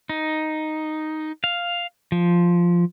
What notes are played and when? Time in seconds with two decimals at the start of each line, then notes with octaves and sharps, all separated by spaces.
0.09 D#4
1.44 F5
2.12 F3